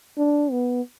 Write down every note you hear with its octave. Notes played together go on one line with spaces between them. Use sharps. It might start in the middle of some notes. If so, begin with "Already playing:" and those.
D4
B3